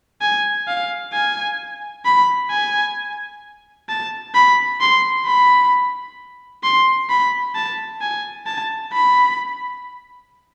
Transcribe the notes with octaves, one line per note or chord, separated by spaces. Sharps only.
G#5
F5
G#5
B5
G#5
A5
B5
C6
B5
C6
B5
A5
G#5
A5
B5